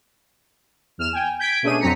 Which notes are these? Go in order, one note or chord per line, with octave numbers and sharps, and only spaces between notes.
E2 F6 E7
G5 G#5
G6 G#6 B6 D7
B2 A3 C#4 D4 G#4 D#7
F2 F#3 C4 A#5 B6 C#7